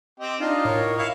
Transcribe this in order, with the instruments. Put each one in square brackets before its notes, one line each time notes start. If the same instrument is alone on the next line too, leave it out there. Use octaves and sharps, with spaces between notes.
[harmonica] C4 G4 D#5
[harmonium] D4 D#4 D#5 [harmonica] F4
[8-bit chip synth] A2 [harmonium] A#4 C#5
[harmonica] E4 F5 C#6